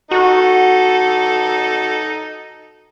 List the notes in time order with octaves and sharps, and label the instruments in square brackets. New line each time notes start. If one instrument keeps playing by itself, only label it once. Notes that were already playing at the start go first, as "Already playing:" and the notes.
[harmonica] D#4 A4 [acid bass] F#4